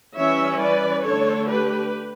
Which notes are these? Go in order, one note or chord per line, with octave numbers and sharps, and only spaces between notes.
E3 G3 C#4 C#5 E5
B4 D5
D3 A3 D4 A4 C#5
G4 B4